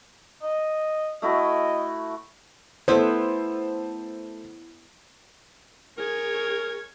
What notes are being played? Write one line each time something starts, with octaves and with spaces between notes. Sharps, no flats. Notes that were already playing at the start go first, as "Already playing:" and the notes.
D#5
A3 E4 F#4 D#5
A3 B3 E4 C5
G#4 A#4 C#5 G#6